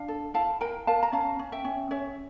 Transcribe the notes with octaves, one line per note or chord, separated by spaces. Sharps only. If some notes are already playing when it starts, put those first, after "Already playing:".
Already playing: D4 F5
A4
E4 F5 A5
A#4 G5 A#5
A#4 F5 A5
A#5
C#4 F5 A5
C#4
E5 G5
C#4
C#4 C#5 E5